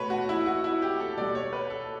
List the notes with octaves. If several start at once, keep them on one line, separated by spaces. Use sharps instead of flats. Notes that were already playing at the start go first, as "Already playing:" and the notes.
Already playing: B2 A3 B4 C#5
F#4
E4
F#4
E4
G4
A4
B2 G3 D5
C#5
B4
A4